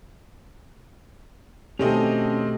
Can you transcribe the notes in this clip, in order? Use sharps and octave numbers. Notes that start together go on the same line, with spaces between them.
B2 D#3 A3 C4 C#4 G4 A4 D#5